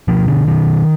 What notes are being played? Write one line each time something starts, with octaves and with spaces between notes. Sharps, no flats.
B2 F3
D3
B2 D#3